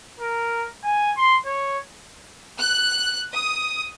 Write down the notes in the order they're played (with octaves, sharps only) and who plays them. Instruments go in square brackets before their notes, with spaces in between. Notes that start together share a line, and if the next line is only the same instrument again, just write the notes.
[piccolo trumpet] A#4
G#5
C6
C#5
[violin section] F#6
D#6